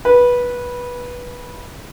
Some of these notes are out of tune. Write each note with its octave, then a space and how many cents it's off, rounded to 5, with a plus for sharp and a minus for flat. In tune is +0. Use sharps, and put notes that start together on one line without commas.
B4 -15